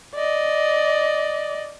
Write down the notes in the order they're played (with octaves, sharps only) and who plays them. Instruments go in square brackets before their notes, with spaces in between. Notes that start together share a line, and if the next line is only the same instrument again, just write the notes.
[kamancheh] D5 D#5